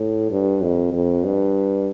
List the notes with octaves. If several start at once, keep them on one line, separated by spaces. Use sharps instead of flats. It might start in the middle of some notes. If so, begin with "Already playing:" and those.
Already playing: A2
G2
F2
F2
G2